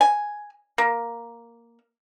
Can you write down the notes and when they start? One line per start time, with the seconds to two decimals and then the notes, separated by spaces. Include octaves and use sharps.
0.01 G#5
0.78 A#3